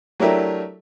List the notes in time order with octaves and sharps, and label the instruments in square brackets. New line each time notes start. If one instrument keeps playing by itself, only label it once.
[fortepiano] F#3 A3 D4 E4 G4 A#4